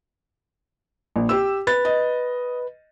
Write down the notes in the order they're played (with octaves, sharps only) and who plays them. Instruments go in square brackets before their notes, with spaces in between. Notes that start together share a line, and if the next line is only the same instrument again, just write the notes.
[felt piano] A#1
G4 E6
[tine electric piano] B4 [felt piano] A6
[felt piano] D#5